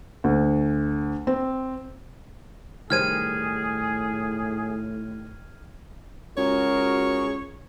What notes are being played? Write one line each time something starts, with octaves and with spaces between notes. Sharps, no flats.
D2
C4
A2 D#3 G3 G#4 C5 F6 G#6 D#7
C#2 F#4 G#4 A#4 C#5